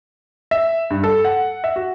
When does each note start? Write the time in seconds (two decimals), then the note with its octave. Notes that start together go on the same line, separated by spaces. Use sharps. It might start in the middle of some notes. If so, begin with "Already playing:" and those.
0.51 E5
0.90 G2
1.03 A4
1.25 F#5
1.64 E5
1.76 F#4